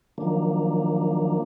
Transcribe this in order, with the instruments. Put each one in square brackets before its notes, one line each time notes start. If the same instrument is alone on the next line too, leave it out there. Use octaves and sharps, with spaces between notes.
[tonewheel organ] D#3 F3 F#3 A#3 D4